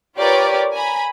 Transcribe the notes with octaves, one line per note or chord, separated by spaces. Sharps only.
F4 G4 A#4 B4 C#5 D5
G#5 A#5 B5